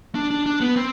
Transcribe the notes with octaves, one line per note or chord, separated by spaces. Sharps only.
D4
D4
D4
B3
C4